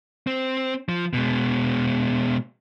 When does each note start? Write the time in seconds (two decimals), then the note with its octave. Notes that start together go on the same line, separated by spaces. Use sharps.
0.27 C4
0.89 F3
1.14 B2 G#3